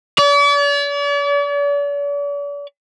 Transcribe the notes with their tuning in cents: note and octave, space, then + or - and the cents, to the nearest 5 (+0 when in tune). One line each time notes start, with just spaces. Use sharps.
D5 -45